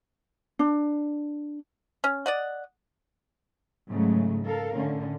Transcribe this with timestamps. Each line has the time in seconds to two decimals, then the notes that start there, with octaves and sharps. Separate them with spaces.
0.59 D4
2.04 C#4
2.26 D5 D#5 F#5
3.88 G#2 C#3 F#3 G#3 A3
4.45 A4 A#4 F5
4.74 A2 D3 C#4